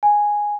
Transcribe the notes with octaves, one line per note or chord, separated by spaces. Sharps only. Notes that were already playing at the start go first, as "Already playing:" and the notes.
G#5